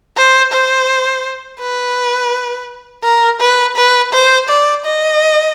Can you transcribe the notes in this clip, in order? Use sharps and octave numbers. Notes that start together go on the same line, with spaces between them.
C5
C5
B4
A#4
B4
B4
C5
D5
D#5